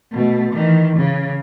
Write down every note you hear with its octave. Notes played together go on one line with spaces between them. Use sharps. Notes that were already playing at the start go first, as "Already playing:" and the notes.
B2 A3
D#3 E3
C#3